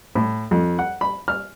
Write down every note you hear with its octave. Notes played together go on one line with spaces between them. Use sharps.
A2
F2
F#5
B5
F6